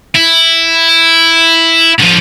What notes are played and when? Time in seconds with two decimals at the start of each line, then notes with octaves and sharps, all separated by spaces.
0.15 E4
2.00 D3 F3